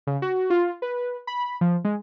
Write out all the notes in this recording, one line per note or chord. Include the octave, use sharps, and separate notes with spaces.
C#3
F#4
F4
B4
B5
F3
G#3